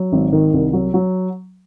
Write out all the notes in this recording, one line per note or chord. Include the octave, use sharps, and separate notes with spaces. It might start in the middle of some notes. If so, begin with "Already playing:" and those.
Already playing: F#3
G#1
D#3
C2
F#3
F#3